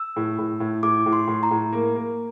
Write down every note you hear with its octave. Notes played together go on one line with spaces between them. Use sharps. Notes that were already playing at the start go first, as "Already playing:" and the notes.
Already playing: E6
A2
A2
A2
A2 D6
A2
C6
A2
A#5
A2
A#3
A#3